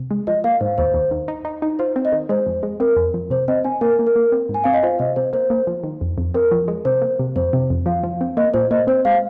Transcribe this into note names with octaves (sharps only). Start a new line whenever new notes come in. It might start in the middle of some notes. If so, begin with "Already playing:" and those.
Already playing: C3
G#3
F3 D#5
A#3 F5
G#2 C5
D#2 C5
D#2
D#3
D#4
D#4
D#4
F4 C5
C4
D#5
D#3
G#3 C5
F2
G#3
C4 A#4
F2
F3
C3 C5
C4 D#5
C4 G#5
A#3 A#4
A#3
A#4
A#3
C4
G#2
G#5
C4 F5
D#5
F4 C5
C3 D#5
C3 C5
A#3 C5
A#3
F3
D#3
F2
F2
C4 A#4
F3
G#3
C3 C5
A#3
C3
F2 C5
C3
F2
F3 F5
F3
C4
A#3 D#5
A#2 C5
A#3 D#5
C4 C5
G#3 F5